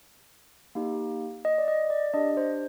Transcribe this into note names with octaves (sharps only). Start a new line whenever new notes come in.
A#3 D#4 G4
D#5
D5
D#5
D5
D4 G4 D#5
C5